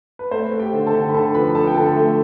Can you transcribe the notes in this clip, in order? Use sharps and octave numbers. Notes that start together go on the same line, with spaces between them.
B4
A3 C5
A3
G4 G5
D3
A4 A5
D3
B5
D3 A4 A5
F3 B4 B5
F3 A4 A5
G5
D3 A4 A5
A3